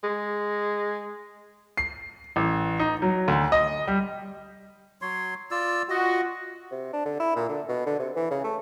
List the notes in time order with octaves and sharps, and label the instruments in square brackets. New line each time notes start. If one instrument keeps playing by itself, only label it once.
[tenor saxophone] G#3
[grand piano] C7
A1
D#4
F#3
D2
D#5
G3
[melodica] F#3 C#5 C6
F4 D5 E6
[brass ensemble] F4 F#4 [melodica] D#5
[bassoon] C3
D4
D3
E4
A#2
D3
B2
D3
C3
E3
C#3
A3